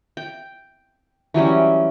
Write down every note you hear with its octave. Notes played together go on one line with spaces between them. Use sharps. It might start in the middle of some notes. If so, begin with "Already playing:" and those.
G5
E3 F#3 G3 C#4